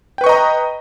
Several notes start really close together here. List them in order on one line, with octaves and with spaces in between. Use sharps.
G5 B4 C#6 D#5 A#5